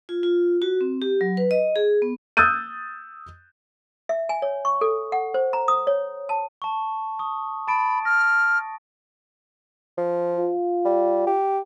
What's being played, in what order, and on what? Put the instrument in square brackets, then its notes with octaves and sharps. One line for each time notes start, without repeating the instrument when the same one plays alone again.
[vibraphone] F4
F4
F#4
C4
G4
F#3
B4
D#5
G#4
B3
[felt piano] D#6 E6 F#6 G6 A6 D#7
[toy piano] E5
G#5
C#5
C#6
A4
F#5
C5
A#5
D#6
C#5
A5
[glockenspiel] A5 C#6
C#6 D#6
[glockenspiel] A5 A6 D7 [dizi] B5
[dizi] F6 [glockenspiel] A#6
[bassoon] F3
[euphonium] F4
[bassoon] G3
G4